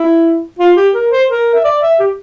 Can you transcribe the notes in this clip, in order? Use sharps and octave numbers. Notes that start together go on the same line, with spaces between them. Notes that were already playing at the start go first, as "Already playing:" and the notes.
Already playing: E4
F4
G4
A#4
C5
A#4
E5
D5
E5
G4